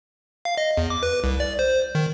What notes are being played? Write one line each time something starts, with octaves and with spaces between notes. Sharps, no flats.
F5
D#5
E2
D6
B4
C2
D5
C5
D#3